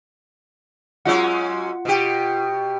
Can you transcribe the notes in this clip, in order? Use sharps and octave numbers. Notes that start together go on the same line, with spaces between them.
F#3 G#3 C#4 F4 F#5
B2 G4